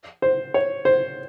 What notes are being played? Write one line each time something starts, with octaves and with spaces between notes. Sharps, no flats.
C5
C#5
C5